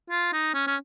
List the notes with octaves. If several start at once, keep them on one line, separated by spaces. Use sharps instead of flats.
F4
D#4
C#4
C#4